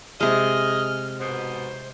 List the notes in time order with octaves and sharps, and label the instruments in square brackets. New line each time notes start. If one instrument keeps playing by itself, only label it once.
[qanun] C3 G#3 [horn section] G#4 D#5 [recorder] F6
[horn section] G#2 B2 [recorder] C5